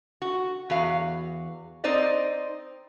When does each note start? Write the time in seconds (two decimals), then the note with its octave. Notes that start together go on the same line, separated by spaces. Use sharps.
0.22 F#4
0.70 E2 F#4 F5
1.84 C4 D#4 C5 D5 D#5